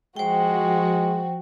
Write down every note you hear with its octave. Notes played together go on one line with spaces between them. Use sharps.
F3 G#3 F#4 C5 G5